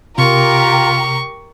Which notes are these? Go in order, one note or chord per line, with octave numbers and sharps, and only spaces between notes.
C3 F4 G4 A#4 C#6